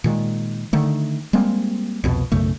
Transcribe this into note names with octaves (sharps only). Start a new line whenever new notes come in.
A#2 D#3 G#3
D3 D#3 A3
G3 G#3 A#3 C4
C2 F2 B2
B1 F#2 C#3 A3